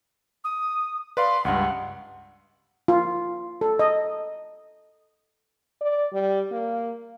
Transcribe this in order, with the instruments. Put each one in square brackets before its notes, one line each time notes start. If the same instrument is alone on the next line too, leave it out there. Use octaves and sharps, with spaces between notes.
[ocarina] D#6
[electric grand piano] B4 D5 F5 [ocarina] C6
[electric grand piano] C#2 G2 [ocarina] F#5
[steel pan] F4
A4
D#5
[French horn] D5
G3
A#3